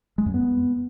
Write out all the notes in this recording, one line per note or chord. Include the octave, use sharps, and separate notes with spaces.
G#3
F#2
B3